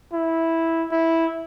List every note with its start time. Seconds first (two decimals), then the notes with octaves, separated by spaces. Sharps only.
0.13 E4
0.92 E4